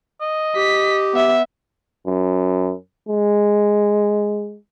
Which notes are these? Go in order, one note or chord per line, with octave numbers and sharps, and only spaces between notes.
D#5
G4 B6
B3 E5
F#2
G#3